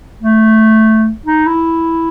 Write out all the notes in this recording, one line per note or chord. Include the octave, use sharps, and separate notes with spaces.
A3
D#4
E4